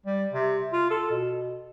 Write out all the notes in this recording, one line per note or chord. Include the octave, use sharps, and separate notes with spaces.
G3
C3
F4
A4
B2